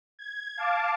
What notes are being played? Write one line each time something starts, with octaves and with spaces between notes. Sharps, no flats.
G#6
F5 A5 D6